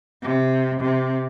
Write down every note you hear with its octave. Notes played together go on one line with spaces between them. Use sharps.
C3
C3